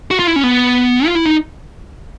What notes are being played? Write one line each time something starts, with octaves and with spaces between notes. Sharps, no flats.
F#4
F4
E4
C#4
B3
F4
E4
D#4